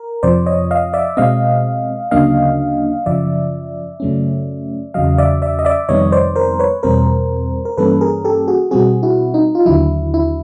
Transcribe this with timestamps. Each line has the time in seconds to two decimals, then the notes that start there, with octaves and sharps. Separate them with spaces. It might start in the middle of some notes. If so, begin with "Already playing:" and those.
Already playing: A#4
0.23 F2 C3 F3 C5 D5
0.46 C#5 D#5
0.71 D#5 F5
0.93 D5 E5
1.17 B2 G#3 C4 D#5 F5
2.11 D2 C#3 F#3 A#3 D4 D#5 F5
3.06 F#2 C#3 F3 D5 E5
4.00 F#2 C#3 F#3 A3 C#4
4.94 E2 C#3 F#3 D#5 F5
5.18 D5 E5
5.42 D5 E5
5.59 D#5
5.65 D5 E5
5.89 F2 C3 D#3 G3 B3 C#5 D#5
6.12 C5 D5
6.36 A#4 C5
6.59 B4 C#5
6.83 E2 B2 G3 C4 A#4 C5
7.65 A#4
7.77 G2 E3 G3 A#3 C#4 A4 B4
8.01 G#4 A#4
8.25 G4 A4
8.48 F#4 G#4
8.71 B2 G3 C4 F#4 G#4
9.03 E4 F#4
9.34 D#4
9.55 F4
9.66 D#2 D3 F#3 E4
10.14 E4